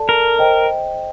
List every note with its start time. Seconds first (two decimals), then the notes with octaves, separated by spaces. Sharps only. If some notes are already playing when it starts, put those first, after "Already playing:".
Already playing: A4 D5 A5
0.09 A#4
0.39 C5 D#5 G5